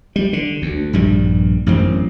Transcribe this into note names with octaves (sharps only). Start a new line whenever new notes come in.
G3
D3
D2
A#1 G2 G3
A1 F#2 C4